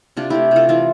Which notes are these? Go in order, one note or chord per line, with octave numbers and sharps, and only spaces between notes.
C3 D4 F4
A3 E4 G4
C3 F4 A4
E3 F4 A4